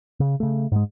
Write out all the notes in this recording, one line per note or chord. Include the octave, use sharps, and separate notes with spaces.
C#3
C#3 A3
G#2 G#3